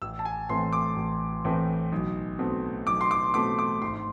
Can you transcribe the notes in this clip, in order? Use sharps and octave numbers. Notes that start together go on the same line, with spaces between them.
A1 E6
A5
G#5
A2 E3 A3 C4 C6
D6
A1
A2 E3 A3 C4
B1
B2 A3 C4
B1 D6
C6
D6
B2 A3 C4 D6
D6
G#1 C6